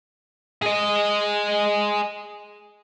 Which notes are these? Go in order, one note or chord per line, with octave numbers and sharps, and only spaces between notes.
G#4 D#5